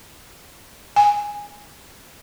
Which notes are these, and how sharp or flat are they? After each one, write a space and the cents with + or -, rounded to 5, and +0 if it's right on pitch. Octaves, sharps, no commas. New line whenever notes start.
G#5 -10